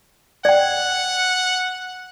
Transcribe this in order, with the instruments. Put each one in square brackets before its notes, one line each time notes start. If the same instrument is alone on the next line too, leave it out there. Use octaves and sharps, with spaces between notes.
[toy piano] D5 G5 [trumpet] F#5